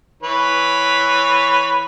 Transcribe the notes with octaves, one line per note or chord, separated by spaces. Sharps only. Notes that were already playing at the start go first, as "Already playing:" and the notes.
E3 B4 C#5